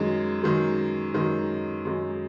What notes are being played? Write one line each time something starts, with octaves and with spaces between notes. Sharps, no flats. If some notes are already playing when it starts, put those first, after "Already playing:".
Already playing: F#2 D#3 G#3
F#2 D#3 G#3
F#2 D#3 G#3
F#2 D#3 G#3